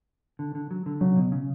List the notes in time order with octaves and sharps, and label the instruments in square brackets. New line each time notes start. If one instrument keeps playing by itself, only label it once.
[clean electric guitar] D3
D3
F#3
D3
[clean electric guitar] C#3 [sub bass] F#3
[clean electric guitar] B2
C#3